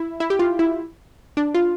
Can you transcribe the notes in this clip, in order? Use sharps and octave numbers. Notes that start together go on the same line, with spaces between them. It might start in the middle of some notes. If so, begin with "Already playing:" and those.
Already playing: E4
E4
G4
F4
E4
D4
F4